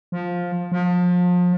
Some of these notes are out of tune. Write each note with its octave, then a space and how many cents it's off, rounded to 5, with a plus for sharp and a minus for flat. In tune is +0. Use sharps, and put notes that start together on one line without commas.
F3 +10
F3 +30